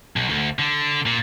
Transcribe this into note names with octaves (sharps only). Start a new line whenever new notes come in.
B1
D2
D3
A#2